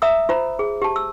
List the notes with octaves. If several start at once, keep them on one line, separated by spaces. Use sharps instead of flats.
E5 A#5 D#6 E6
F4 C5 A#5
G#4
G4 A5
E6